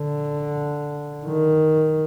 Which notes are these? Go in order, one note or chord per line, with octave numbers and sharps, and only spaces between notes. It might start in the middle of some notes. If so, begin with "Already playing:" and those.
Already playing: D3
D#3